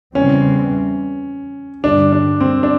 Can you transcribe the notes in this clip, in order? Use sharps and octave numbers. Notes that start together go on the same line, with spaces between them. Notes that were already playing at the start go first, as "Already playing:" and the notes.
E2 C#3 E3 G3 C4 C#4
G2 D3 G3 D4
D4
C4
D4